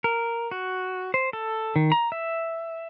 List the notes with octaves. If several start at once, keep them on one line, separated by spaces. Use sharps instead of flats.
A#4
F#4
C5
A4
D#3
A#5
E5